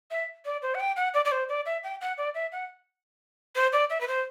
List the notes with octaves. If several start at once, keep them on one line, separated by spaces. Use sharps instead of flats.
E5
D5
C5
F#5
G5
F#5
D5
D5
C5
D5
E5
G5
F#5
D5
E5
F#5
C5
D5
E5
B4
C5